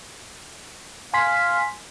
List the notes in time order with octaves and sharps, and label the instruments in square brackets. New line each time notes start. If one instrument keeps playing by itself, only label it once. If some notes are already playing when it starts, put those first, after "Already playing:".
[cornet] F5 [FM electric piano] G#5 C6 B6